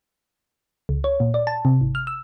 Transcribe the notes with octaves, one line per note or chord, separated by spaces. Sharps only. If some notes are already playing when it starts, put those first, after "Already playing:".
C#2
C#5
A#2
D5
A5
C3
G#1
F6
E6